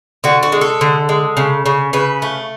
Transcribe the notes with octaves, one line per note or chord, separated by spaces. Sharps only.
D3 F#4
F#4
G#3
A4
D3
G#3
C#3
C#3
C#3 B4
A3